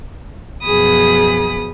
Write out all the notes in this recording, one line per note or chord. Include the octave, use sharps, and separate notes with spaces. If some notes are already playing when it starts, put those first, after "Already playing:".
F#2 B2 F3 G#4 B5 D#6